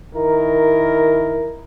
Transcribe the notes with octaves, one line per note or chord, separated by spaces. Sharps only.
D#3 E4 A#4